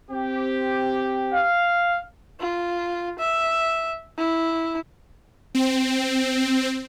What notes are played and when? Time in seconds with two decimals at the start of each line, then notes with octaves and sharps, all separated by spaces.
0.11 C4 G4
1.34 F5
2.40 F4
3.19 E5
4.18 E4
5.55 C4